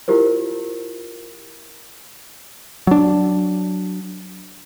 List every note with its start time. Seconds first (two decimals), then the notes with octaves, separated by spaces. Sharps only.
0.08 E4 F4 G4 A#4 C5
2.87 F#3 D4